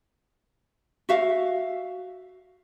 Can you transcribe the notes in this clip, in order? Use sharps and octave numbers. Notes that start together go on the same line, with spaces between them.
F#4 E5 F5